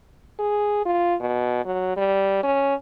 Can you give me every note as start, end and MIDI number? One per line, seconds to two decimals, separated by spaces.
0.39 0.82 68
0.85 1.15 65
1.20 1.64 47
1.65 1.97 54
1.97 2.42 55
2.43 2.75 61